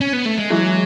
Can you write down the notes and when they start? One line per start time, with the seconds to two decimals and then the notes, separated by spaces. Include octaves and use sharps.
0.01 C#4
0.13 B3
0.25 A3
0.38 G#3
0.50 E3 F#3 G#3